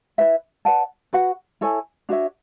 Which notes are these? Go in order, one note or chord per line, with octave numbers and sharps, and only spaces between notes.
E4 B4 E5
B4 D5 F#5 A5
F#4 B4 F#5
E4 A4 C#5 G#5
D4 F#4 C#5 E5